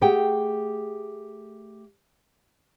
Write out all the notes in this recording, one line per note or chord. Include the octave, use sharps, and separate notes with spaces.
A3 G4 G#4 F#5 G5